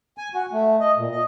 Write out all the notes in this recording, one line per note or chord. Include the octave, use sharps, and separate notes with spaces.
G#5
F#4
A3
D#5
A#2
D#5